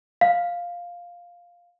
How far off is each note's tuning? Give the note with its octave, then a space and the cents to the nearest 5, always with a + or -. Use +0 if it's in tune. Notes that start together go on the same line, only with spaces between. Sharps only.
F5 +5